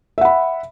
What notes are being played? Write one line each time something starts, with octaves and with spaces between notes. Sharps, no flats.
E5 F#5 B5